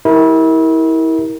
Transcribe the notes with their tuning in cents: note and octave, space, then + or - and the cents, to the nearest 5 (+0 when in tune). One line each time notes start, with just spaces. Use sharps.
E4 -30 G4 +0 A#4 +0